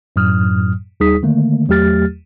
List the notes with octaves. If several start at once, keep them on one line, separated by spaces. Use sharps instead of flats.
F#2 A2 F#3 D#6 F6
D#2 G3 D#4 G#4 D#6 B6
D3 D#3 A3 A#3
E2 F#3 A3 G4 F6 A6